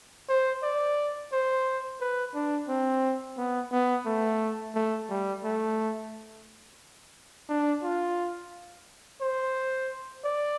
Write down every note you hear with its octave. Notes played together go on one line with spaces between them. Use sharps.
C5
D5
C5
B4
D4
C4
B3
B3
A3
A3
G3
A3
D4
F4
C5
D5